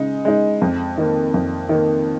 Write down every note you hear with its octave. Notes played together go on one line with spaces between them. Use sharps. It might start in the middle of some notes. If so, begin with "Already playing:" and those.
Already playing: C#3 G#3 D#4
G#3 D#4
F2
D#3 A#3
F2
D#3 A#3